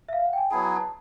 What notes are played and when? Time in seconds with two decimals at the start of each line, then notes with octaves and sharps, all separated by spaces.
0.09 E5
0.13 F5
0.26 F#5
0.33 G5
0.38 G#5
0.51 F#3 B3 E4 G#4 A5
0.63 A#5
0.76 A5